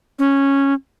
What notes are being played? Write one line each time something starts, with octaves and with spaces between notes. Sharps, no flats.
C#4